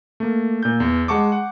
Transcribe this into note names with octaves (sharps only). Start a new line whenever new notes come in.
A3 A#3
A#2 G6
E2
G#3 F#5 A5 C#6 D6
F#5